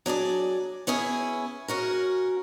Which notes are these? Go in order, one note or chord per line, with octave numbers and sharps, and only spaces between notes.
F#3 D4 G#4 D5
B3 C#4 E4 G#4
C#4 F#4 A#4